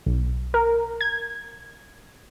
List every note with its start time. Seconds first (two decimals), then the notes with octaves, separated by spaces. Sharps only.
0.06 B1
0.54 A#4
1.01 G#6